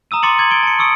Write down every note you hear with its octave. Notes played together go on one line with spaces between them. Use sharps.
A#5 D#6 E6 D#7
C6 D6 A6 C#7 D#7 F#7
D6 G#6 A6 F#7
G#6 D7 G7
A5 C#7
C#6 D#6 E6 C#7 D7